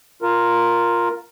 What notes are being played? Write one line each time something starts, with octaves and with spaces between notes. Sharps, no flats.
F4 A#4